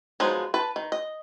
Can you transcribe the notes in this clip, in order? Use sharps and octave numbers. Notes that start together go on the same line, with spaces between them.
F3 F#3 G#3 B3 D#4
B4 A5
D#3
D#5